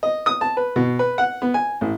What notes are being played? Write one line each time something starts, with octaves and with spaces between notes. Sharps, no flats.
D#5
D#6
A5
B4
B2
B4
F#5
B3
G#5
A1